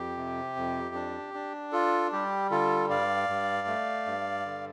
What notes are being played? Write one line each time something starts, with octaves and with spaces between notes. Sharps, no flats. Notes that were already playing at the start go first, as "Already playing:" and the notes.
Already playing: F2 G4
C3
F2
D4
D4
F4 A4
G3 G4
D3 F4 A4
G2 D5 F5
G2
A3
G2
D3